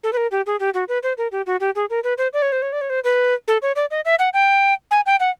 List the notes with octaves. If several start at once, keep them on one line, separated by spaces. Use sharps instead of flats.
A4
B4
A#4
G4
G#4
G4
F#4
B4
C5
A#4
G4
F#4
G4
G#4
A#4
B4
C5
D5
C#5
C5
C#5
D5
C#5
C5
B4
A4
C#5
D5
D#5
E5
F#5
G5
G#5
G5
F#5